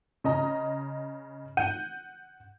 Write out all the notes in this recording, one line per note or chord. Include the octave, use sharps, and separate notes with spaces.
C#3 D#5 A#5
F#5 G6 D#7